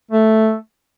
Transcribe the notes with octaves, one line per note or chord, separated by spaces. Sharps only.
A3